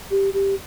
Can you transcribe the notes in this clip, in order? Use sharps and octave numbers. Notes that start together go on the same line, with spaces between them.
G4
G4